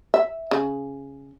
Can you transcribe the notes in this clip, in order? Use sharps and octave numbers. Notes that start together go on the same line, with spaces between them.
E5
C#3